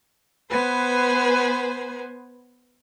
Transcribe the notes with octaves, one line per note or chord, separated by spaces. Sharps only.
B3 B4 C5 G#5